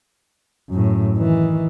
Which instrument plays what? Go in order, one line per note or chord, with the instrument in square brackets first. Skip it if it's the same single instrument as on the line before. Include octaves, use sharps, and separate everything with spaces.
[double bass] F#2 A2
D#3 E3